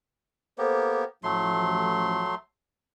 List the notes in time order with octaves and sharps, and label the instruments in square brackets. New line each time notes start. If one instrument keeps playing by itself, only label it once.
[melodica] A#3 B3 G4 [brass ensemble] A4 C5
[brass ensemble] A1 F3 [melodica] F#3 A3 C6